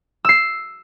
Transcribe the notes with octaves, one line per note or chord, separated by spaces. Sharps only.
E6 C7